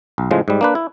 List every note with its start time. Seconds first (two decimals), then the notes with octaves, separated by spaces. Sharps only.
0.18 B1
0.31 A2 C#3 F3 G#3
0.48 G#2 G3
0.61 A#3 D4 B4
0.75 E4